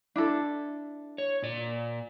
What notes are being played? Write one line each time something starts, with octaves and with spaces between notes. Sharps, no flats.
D4 E4 A4
C#5
A#2 D5